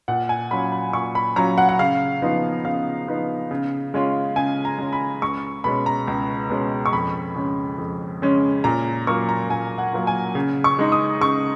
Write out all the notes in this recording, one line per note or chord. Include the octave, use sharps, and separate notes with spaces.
A#2 F#5
G#5
F#3 C#4 F4 B5
B5
A#2 C#6
B5
F#3 C#4 F4 A#5
F#5
F#5
C#3 F5
F3 B3 D#4
C#3 F5
F3 B3 D#4
C#3
G#3 C#4 F4
C#3 G#5
A#5
G#3 C#4 F4
B5
C#2 C#6
B2 G#3 C#4 B5
A#5
C#2
B2 G#3 C#4
C#6
F2 B5
C#3 G#3 C#4
F2
C#3 G#3 C#4
A#2 A#5
F#3 A#3 F4 C#6
A#5
A#2 G#5
F#5
F#3 A#3 F4
G#5
C#3
C#6
G#3 D#4
D#6
C#3 C#6